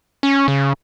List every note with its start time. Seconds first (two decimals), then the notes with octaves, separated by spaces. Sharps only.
0.23 C#4
0.48 C#3